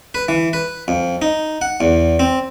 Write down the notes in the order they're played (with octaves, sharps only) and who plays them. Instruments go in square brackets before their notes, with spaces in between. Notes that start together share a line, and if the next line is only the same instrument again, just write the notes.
[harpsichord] B4
E3
B4
F2
D#4
F#5
E2
C4